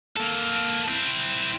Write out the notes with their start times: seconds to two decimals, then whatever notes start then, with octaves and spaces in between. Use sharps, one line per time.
0.17 A#3 A4
0.88 C4 E4